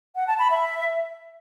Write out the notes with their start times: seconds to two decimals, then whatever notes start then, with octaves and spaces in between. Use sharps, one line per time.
0.16 F#5
0.27 A5
0.39 B5
0.50 E5